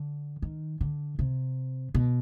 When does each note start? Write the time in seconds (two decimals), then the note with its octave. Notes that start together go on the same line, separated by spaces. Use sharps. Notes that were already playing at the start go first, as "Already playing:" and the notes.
Already playing: D3
0.42 D#3
0.81 D3
1.19 C3
1.95 B2